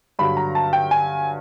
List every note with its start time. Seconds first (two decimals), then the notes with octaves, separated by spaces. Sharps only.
0.19 G2 D3 F#3 B5
0.37 A#5
0.55 A5
0.73 G5
0.91 G#5